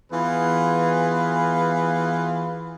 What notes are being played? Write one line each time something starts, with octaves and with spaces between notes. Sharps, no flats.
E3 B3 F4 G#4 B4